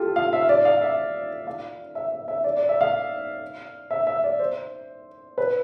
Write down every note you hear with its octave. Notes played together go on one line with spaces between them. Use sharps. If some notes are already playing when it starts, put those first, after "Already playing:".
Already playing: F4 G4 A4
F5
E5
D5
F5
E5
F5
E5
E5
E5
D5
D5
E5
F5
E5
E5
D5
C5
B4